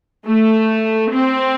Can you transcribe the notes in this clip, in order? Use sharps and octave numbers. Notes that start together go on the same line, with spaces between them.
A3
C4